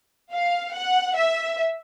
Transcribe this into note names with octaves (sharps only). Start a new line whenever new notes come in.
F5
F#5
E5